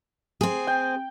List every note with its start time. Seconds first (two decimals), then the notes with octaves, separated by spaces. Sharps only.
0.41 C4 G#4
0.67 G5